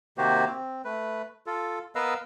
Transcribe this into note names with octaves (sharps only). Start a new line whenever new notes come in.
C3 D#3 A#3 F#4 G4 C5
C4
A3 B4
F4 A4
B3 A#4 B4 D#5 F5 E6